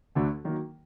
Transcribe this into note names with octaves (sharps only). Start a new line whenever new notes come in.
D2 D3 A3 D4 F#4
D#3 F#3 A#3